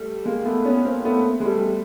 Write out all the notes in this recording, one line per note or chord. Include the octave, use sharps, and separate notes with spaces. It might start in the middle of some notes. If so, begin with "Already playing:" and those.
Already playing: G3 A3
G#3 A#3
A3 B3
B3 C#4
A#3 C4
A3 B3
G#3
G3 A3